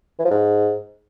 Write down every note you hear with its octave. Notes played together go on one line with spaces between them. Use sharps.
E3
F3
G#2